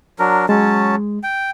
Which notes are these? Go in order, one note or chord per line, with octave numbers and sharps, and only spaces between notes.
F#3 D4 A#4
F#3 G#3 C#4 A5
G5